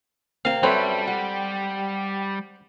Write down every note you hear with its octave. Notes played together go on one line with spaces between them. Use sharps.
C3 A#3 C4 F5
F#2 G3 C4 A4 B4 C#5 E5
G4 F#5